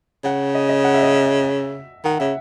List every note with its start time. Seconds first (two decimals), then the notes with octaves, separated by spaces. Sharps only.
0.24 C#3 F#5
0.55 D#5
0.69 D#5
0.84 F#5
0.94 E5
1.03 D#5
1.13 E5
2.05 D#3 F#5
2.19 C#3 E5